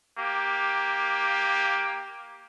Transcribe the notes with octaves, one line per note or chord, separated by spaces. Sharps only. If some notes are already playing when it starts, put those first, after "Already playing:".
A#3 G4